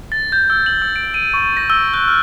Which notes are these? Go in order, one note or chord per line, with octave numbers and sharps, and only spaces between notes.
A6
G6
E6
F#7
E6
D7
D#7
C#6
A#6
E6
F#6
F6